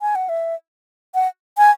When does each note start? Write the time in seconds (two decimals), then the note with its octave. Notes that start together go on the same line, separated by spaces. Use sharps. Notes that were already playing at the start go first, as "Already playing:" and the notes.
0.01 G#5
0.15 F#5
0.29 E5
1.15 F#5
1.58 G#5